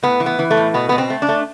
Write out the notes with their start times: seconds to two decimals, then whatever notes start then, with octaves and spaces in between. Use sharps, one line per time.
0.03 A2 B3
0.20 E3
0.26 B3
0.39 E3
0.51 A3
0.57 A2
0.74 B2 B3
0.89 B2 B3
0.98 C4
1.10 A3
1.22 D4
1.28 A3